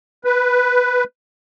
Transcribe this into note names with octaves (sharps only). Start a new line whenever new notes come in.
B4